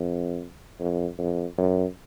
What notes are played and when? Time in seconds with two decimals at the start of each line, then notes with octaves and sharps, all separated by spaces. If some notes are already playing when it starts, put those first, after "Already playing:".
Already playing: F2
0.80 F2
1.18 F2
1.58 F#2